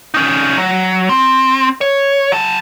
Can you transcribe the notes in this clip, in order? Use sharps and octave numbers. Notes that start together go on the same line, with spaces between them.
C#4 D#4
F#3
C4
C#5
F#3 A5